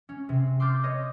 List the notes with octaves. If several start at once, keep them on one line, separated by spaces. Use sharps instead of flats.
C#4
C3 C4
C6 D6 E6 F6 G6 A6
C#5 D#5